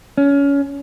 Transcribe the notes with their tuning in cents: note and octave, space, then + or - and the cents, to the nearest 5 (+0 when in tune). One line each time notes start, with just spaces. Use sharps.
C#4 +25